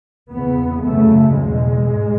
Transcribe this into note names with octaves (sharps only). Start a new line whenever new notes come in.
E2 C#3 B3
F#2 C#3 A3
E2 B2 G#3
G#2